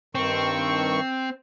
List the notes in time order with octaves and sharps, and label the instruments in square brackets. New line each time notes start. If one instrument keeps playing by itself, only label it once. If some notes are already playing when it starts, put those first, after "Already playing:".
[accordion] G2 D#3 C#6 [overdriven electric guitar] C4